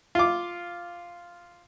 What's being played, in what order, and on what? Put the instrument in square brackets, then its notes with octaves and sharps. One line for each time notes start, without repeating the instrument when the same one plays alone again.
[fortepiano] F4 D6